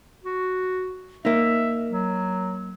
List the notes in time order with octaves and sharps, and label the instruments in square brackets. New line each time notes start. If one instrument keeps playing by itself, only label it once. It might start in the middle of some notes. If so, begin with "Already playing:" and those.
[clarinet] F#4
[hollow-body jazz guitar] A#3 D#4 [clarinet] E5
[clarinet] F#3